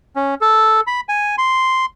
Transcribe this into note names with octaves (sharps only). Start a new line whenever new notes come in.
C#4
A4
B5
G#5
C6